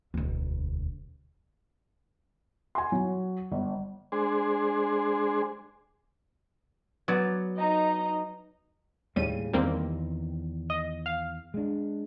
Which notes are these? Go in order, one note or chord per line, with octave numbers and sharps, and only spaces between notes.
E1 D2
G#5 C6
F#3
G1
G#3 D4 G#4 C5
F#3 B3 D5
D#4 D#5 A#5
D#2 A2 C#3 G3 D#7
E2 D#3 G3 A#3 C4
D#5
F5
G#3 D4